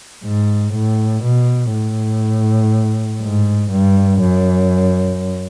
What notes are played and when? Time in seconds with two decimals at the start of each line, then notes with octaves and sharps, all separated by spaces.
0.24 G#2
0.74 A2
1.24 B2
1.73 A2
3.21 G#2
3.71 G2
4.21 F#2